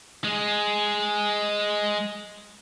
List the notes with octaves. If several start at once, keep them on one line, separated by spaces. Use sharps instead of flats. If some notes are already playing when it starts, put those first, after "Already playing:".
G#3 G#4